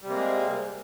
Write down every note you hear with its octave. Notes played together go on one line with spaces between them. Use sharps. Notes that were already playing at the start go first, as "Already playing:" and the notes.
C3 G3 G#3 A#3